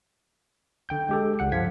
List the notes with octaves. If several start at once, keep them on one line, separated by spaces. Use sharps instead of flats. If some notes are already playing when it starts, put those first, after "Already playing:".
D3 G5 G6
G#3 G4 A4
C#2 F#5 C#7
G2 F3 F5 G#6 B6